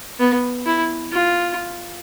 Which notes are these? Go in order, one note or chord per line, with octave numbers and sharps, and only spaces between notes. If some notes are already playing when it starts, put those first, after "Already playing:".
B3
E4
F4